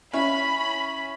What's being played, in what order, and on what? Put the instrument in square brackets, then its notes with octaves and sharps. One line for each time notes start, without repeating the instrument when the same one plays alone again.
[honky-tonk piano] C#4 E4 [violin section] B5